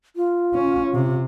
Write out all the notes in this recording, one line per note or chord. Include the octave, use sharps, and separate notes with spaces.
F4
C#4
C3